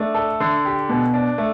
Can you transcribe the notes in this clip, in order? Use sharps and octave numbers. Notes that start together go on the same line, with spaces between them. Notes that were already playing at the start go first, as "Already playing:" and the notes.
Already playing: A3 D4
A4
D3
G4
B2
D4
A3